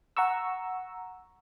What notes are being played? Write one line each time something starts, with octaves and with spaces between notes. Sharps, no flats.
F#5 A#5 C#6 E6